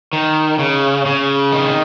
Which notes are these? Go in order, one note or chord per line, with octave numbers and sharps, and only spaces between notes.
D#3
C#3
C#3
D#3